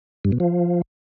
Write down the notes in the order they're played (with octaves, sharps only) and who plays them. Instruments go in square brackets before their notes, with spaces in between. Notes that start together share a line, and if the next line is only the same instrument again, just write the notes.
[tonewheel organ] G2
B2
F3